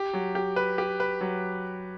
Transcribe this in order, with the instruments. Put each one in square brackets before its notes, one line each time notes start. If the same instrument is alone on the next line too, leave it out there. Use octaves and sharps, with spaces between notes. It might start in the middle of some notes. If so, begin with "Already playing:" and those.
Already playing: [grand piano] G4
F#3
G4
B4
G4
B4
F#3